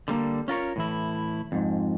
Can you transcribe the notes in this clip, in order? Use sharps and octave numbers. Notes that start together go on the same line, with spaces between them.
D3 G3 A#3
C#4 F4 A#4 C#5
A2 E3 E4
F2 G#2